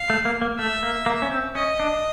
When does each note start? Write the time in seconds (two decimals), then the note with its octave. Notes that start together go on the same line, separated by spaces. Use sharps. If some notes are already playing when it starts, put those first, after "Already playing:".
Already playing: F5
0.10 A3
0.25 A#3
0.41 A#3
0.58 A3 E5
0.83 A#3
1.06 A#3
1.22 C#4
1.31 C4
1.55 C#4 D#5
1.80 D4